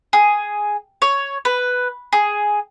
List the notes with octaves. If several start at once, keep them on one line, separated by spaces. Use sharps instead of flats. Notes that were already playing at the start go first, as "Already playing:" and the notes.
G#4
C#5
B4
G#4